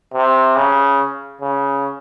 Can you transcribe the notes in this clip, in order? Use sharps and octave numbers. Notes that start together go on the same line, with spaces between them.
C3
C#3
C#3